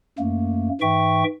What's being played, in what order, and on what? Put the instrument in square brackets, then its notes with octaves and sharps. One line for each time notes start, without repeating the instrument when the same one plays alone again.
[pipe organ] F#2 A3 A#3
G#2 E3 E5 G5 C#6